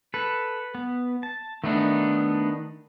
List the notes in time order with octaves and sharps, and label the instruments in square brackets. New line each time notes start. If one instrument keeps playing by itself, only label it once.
[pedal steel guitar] A4 [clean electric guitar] B4
[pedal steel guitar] B3
A5
[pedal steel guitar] D#3 D#4 [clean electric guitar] A3 B3 D4